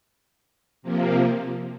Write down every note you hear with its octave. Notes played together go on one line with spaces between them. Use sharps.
C3 F3 A#3